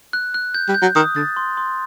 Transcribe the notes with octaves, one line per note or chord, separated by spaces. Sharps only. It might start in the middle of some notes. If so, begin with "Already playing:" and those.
F#6
F#6
G6
G3
G6
F#3
D#3 D#6
D3 A6
C6
C6